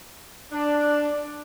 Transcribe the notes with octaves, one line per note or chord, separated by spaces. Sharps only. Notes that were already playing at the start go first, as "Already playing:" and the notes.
D4